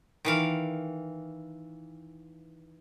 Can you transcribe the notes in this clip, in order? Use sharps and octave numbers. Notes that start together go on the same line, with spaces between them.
D#3 E3 F5